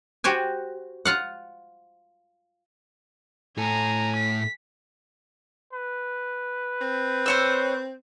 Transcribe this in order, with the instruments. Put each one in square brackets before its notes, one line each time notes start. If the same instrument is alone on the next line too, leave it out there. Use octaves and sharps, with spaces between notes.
[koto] F#4 G4 C5 G#5
F4 F5 F#5
[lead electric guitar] A2 A4 [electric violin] G#5 A#5
[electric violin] B6
[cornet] B4
[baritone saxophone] C4
[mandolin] C5 C#5 E6